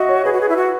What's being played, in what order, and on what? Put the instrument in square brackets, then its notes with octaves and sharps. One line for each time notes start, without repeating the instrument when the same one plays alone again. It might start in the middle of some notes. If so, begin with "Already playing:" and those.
Already playing: [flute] F#4 [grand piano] D#5 E5
[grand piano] C#5
[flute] G#4 [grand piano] B4
[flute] F#4
G#4
E4
F#4